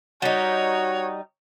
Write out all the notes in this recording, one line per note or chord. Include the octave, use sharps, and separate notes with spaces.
G3 D#4 F#4 C#5